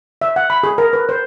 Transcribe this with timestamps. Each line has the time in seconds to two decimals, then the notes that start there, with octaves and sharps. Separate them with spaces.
0.22 E5
0.36 F#5
0.50 B5
0.63 G#4
0.78 A#4
0.93 B4
1.09 C5